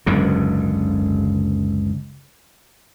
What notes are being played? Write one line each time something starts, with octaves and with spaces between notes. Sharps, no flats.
F#1 C#2 G#2 D3